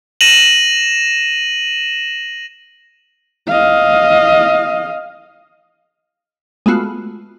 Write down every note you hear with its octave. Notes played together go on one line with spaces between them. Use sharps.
A#6 D#7 E7 F#7
D#5 F5
G#3 A3 B3 F4 F#4